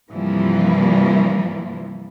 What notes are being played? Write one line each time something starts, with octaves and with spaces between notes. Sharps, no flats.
G2 C3 E3 F3 G3 A#3